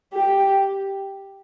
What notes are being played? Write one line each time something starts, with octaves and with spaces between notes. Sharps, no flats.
G4